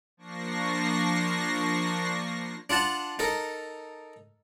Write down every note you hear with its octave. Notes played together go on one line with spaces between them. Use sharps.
F3 A#3 D4 C#6 A#6 C7
D4 F4 F#5 A5
D#4 A4 A#4